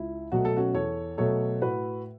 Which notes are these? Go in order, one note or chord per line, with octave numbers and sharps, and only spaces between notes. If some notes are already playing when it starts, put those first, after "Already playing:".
Already playing: C#2 E4
B2 F#3 A3 F#4
A4
C#4 F#4
E2 A4 C#5
B2 F#3 A3 A4 C#5
A2 F#4 B4